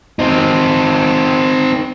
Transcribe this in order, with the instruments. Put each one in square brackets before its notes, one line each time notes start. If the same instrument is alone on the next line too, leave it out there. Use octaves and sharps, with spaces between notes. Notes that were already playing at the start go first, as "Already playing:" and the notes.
[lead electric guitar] C4 D#4